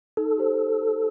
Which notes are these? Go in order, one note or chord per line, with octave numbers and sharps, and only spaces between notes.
D#4 A4
G4 C5